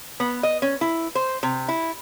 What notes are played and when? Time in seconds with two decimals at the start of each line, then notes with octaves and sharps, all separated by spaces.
0.20 B3
0.43 D#5
0.62 C#4
0.81 E4
1.15 C5
1.43 C3
1.68 E4